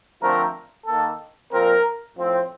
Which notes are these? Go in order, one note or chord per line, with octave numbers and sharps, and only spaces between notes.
D3 F3 A3 C4 A#4
D#3 A#3 A4
A#2 F3 C4 A#4
A2 F3 C4